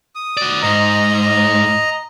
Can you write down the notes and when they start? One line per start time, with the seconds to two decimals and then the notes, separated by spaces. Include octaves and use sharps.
0.15 D#6
0.37 F#4 D5
0.62 G#2 D#5 A#5